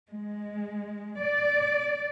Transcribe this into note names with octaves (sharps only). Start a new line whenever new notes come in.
G#3
D5